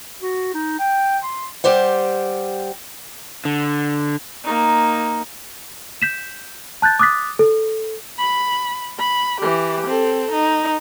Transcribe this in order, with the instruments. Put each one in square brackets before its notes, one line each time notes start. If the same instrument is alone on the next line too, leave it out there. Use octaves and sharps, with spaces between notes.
[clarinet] F#4
D#4
G5
C6
[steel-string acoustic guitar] G3 G4 C5 F#5
[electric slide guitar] D3
[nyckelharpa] A#3 D#4
[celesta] G6 B6 E7
A5 F#6 G6 A6
D6 D#6 F#6 A6 B6
A4
[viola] B5
B5
E3 G4
C4 A4
D#4